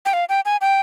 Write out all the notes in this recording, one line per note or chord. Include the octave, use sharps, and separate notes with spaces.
G5
F5
G5
G#5
G5